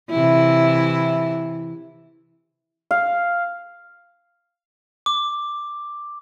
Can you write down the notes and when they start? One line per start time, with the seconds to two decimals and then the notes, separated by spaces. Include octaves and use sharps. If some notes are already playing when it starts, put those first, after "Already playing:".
0.10 C3 E3 E4
2.91 F5
5.06 D6